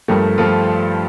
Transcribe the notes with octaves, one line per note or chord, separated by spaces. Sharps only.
G2 F3 A3 G4 A#4
F3 A3 F4 A4